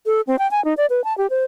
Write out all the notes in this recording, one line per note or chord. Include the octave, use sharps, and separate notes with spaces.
A4
C4
G5
G#5
D#4
D5
B4
A5
G4
C5